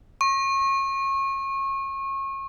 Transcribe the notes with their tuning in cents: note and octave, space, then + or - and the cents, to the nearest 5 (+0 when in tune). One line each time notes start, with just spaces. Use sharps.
C#6 -30